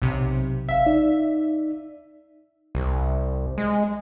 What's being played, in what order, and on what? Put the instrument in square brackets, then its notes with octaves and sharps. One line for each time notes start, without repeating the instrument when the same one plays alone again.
[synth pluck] B1 C3
[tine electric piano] G#1 F5 [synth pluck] E5
[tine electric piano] D#4 D5
[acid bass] C2
G#3